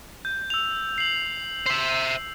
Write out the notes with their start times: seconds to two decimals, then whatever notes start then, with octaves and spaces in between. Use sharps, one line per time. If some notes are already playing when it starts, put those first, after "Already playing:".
0.25 G6
0.50 E6 F7
0.98 C7 F#7
1.66 C5 E5